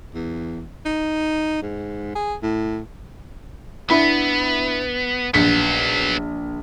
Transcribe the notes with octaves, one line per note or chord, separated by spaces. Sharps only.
E2
D#4
G#2
G#4
A2
B3 D4 E4 B5
A#1 F#3 B3 B6 C#7